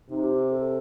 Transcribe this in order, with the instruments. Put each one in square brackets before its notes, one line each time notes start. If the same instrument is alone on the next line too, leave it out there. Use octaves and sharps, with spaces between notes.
[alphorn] C3 [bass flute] D#4
[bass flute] G4
A4